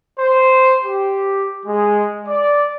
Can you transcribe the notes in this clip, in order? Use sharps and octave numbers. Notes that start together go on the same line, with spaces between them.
C5
G4
G#3
D5